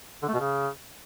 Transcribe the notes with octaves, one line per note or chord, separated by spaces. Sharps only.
D3
A3
B2
C#3